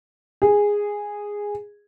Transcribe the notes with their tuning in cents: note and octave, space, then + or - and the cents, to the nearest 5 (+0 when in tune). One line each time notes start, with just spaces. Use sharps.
G#4 -10